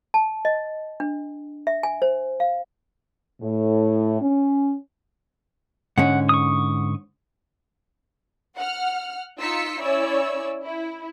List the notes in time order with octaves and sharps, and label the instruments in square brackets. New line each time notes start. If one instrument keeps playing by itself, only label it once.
[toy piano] A5
D#5
D4
E5
G#5
C5
F5
[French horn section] A2
C#4
[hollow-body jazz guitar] G#2 D3 C#4 [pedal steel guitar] F#5
[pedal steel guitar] C#6 D#6
[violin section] F#5 F6
D#4 F4 E6 B6 C#7
C#4 E4 C#5 D5 E6
E4